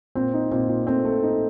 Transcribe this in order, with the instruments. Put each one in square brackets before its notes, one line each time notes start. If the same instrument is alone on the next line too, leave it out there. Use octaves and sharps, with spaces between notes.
[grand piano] A#2 [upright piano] C4
[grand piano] D#4
[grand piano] A#2 [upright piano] C4
[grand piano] A#2
[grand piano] A3 [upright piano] C4
[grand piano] A3
D#4